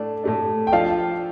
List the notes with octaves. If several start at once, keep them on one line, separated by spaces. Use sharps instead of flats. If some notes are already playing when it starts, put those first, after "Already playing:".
Already playing: A2 A3 D4
A2 A3 D4
G5
F3 D4 F4 A4 D5 F5